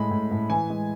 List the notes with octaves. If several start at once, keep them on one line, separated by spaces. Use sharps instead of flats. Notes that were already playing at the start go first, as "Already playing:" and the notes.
Already playing: A2 G#3 B5
A2
A2
E3 G#5
G#3